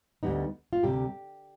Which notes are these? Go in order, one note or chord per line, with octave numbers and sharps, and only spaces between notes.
D2 D3 G3 B3 D#4
F4
D2 C3 G3 G4